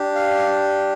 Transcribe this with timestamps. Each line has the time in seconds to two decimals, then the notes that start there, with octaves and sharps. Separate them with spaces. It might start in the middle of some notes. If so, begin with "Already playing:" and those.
Already playing: D4 G4
0.15 F5